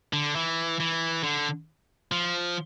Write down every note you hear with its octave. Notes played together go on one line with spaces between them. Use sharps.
D3
E3
E3
D3
F3